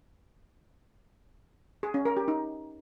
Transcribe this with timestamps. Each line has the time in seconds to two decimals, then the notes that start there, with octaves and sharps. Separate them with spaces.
1.83 G#4
1.94 C#4
2.05 A#4
2.17 G4
2.28 D#4